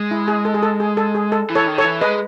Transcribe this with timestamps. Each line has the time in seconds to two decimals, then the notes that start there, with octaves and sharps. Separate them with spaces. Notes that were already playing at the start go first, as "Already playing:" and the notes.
Already playing: G#3
0.11 E4
0.28 G#4
0.45 A4
0.54 G#4
0.63 A4
0.80 G#4
0.97 A4
1.15 G#4
1.32 A4
1.50 E3
1.55 A4 C#5
1.67 D#3
1.78 A4 C#5
1.84 E3
2.01 G#3 B4 D#5